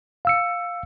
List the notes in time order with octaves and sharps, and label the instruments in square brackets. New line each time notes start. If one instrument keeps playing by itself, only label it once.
[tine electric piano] F5 E6 C#7